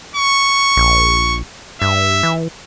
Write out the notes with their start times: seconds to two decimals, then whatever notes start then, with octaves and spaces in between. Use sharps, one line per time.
0.16 C#6
0.77 A#1
1.82 G2 E5
2.23 E3